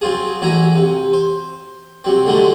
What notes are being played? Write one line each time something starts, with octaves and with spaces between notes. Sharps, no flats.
F#3 C4 F4 G#4
A1 F#3 E4 G#5 A#5
C3
C5
C3 F#3 C4
A2 D3 F#3 G#3 A3